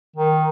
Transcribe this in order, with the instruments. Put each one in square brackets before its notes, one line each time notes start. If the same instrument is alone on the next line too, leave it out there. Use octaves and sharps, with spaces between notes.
[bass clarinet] D#3